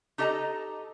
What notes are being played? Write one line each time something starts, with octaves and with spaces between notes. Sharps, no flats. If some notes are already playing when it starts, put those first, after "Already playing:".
D#4 G4 A4 D#5 A5 A#5